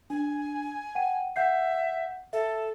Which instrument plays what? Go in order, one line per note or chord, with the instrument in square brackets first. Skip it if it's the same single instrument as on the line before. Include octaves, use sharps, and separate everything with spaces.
[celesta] D4 [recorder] G#5
[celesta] F#5 G5 D#7
[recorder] E5 [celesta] F#5 G6 C7
[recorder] A4 [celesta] E5